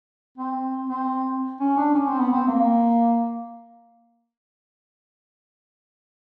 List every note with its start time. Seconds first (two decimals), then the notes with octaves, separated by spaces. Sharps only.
0.38 C4
0.90 C4
1.60 C#4
1.77 D4
1.95 C#4
2.08 C4
2.20 B3
2.33 C4
2.47 A#3